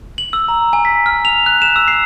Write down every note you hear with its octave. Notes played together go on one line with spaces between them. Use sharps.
F#7
E6
A#5
G#5
B6
F6
F7
F#6
E7
E6
C7